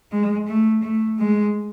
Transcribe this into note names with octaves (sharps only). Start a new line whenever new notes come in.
G#3
A3
A3
G#3